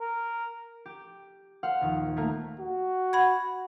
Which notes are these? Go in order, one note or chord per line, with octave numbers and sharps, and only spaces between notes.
A#4
G4
C5 F5 F#5 F6 F#6
A#1 D#2
A3 A#3
F#4
F#5 B5 G#6